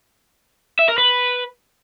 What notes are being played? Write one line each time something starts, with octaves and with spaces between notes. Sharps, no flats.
E5
A#4
B4